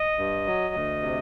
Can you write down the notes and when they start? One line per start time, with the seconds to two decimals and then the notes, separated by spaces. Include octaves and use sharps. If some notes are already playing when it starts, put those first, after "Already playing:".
Already playing: D#5
0.18 G2
0.46 F#3
0.74 D2
1.02 C3